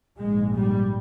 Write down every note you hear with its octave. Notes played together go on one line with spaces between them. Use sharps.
A#1 G#2 G#3
G3